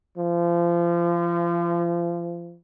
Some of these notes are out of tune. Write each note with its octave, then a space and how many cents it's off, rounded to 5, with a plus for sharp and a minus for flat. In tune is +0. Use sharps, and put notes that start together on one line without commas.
F3 -30